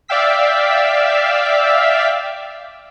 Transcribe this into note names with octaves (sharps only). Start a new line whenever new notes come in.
D5 E5 F5 G5 E6 B6